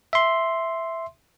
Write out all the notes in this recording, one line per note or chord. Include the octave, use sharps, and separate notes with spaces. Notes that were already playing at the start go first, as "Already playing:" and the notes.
E5 C6